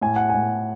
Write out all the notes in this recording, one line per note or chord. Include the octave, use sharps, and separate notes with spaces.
A2 G#5
F#5
A2 G#5